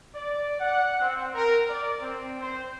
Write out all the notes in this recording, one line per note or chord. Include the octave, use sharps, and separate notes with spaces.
D5
F#5
C4
A#4
D5
C4
C5